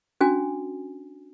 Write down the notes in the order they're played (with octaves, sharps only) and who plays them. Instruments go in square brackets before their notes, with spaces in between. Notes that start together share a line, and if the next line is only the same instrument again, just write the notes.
[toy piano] C#4 D4 F#4 G#5